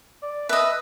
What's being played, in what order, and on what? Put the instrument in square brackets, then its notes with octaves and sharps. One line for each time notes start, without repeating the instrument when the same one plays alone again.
[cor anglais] D5
[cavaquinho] B4 D#5 [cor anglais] E5